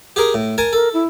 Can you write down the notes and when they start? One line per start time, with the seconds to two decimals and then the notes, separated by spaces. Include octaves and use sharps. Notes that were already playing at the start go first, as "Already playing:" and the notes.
0.16 G4 G#4 A#4
0.34 A2
0.58 A#4 G#5 A5
0.73 A4 A#4
0.94 E4